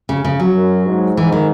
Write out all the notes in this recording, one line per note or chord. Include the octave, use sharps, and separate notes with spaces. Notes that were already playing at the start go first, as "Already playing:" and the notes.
C#3
C#3
F#3
F#2
G#2
G#2 E3
D#3